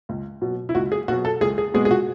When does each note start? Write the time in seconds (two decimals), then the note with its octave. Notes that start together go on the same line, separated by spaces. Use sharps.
0.09 C#2
0.42 B2 F#3
0.69 E4
0.75 C#2 F#4
0.92 G#4
1.08 B2 F#3 F#4
1.25 A4
1.41 C#2 G#4
1.58 G#4
1.74 B2 G#3 B3 G#4
1.85 G#4
1.91 F#4